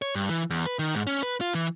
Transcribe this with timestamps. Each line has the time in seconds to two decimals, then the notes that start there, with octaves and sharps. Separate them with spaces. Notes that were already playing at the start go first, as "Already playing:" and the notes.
0.02 C#5
0.15 G2
0.29 E3
0.50 E2
0.66 B4
0.79 D#3
0.95 G#2
1.07 C#4
1.23 B4
1.41 F4
1.55 E3